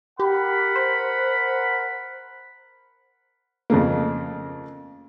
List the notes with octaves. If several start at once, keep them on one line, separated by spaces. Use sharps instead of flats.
G4 A#4 F#5 B5
C5
F2 C#3 A3 A#3